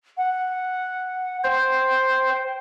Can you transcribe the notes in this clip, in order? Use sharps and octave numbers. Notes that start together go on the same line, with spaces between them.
F#5
C5 G5